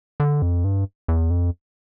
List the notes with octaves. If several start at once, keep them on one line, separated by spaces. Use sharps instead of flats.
D3
F2
G2
E2
F2